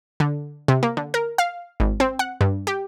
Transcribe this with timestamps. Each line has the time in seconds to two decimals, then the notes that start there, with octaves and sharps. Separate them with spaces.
0.20 D3
0.68 C3
0.83 A#3
0.97 D3
1.14 A#4
1.38 F5
1.80 G#1
2.00 C4
2.19 F#5
2.41 G2
2.67 G4